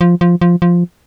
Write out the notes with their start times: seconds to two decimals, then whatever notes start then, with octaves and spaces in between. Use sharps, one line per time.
0.01 F3
0.21 F3
0.41 F3
0.62 F3